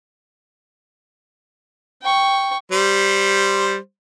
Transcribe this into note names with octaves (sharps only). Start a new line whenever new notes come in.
G5 C#6
G3 C5